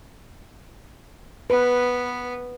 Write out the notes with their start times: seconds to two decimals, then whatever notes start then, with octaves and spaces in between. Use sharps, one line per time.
1.50 B3 B4